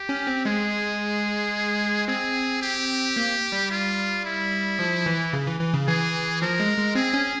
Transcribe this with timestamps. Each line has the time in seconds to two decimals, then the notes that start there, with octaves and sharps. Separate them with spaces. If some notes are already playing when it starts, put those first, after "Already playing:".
Already playing: G4
0.09 C#4
0.27 C4
0.45 G#3 G#4
2.07 C4 G#4
2.62 G4
3.16 A#3
3.52 G3
3.70 F4
4.25 E4
4.79 F3
5.06 E3
5.33 C#3
5.47 E3
5.60 E3
5.74 C#3
5.87 E3 G#4
6.42 F3 A#4
6.60 G#3
6.78 G#3
6.95 C4 G#4
7.14 C#4